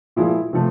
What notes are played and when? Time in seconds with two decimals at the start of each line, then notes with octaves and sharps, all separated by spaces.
0.16 A#2 F3 G#3 E4
0.53 C3 F3 A3